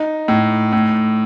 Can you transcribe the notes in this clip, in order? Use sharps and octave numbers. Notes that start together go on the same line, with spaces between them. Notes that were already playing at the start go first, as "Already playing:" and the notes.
Already playing: D#4
A2
A2